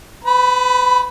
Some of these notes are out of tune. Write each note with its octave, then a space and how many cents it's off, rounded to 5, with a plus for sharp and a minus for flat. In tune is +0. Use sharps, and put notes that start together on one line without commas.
B4 +40 B5 +0